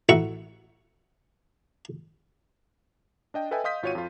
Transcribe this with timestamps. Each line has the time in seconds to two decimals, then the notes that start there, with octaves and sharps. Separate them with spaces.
0.09 A1 F#4 E5 C#6
3.34 D4 D#5 G5
3.51 A4 B4 D#5 E5 G5 G#5
3.64 D#5 F5 C6 D#6 G6 B6
3.83 G#1 F4 F#4 C#5 F5 D#7
3.95 F2 F4